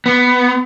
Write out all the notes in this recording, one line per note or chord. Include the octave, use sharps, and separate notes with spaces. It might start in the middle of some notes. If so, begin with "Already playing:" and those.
B3